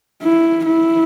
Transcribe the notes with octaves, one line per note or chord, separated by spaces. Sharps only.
E4
E4